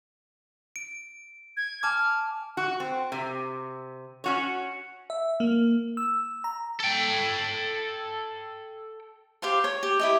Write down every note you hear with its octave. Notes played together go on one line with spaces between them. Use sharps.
D7
G#6
G#5 A5 D6 F6
F#4
C4
C3
C#4 F#4 C#5
E5
A#3
E6
A#5
A4 G5
G4 C5 F5 C6
C#5
G4
E4 G4 D#5